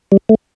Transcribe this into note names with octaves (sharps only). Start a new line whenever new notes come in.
G3
A3